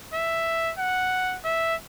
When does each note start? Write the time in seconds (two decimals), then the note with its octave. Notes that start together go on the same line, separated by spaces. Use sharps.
0.14 E5
0.79 F#5
1.45 E5